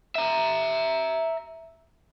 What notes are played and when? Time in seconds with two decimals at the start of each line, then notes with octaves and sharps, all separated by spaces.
0.15 E5 A#5